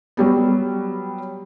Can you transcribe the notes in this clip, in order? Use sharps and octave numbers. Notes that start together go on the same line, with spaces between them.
F#3 G3 B3